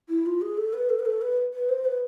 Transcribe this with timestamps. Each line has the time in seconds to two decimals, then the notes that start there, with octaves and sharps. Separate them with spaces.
0.09 E4
0.26 F4
0.42 G#4
0.57 A4
0.73 B4
0.90 A4
0.99 B4
1.06 A4
1.22 B4
1.54 B4
1.69 C5
1.85 B4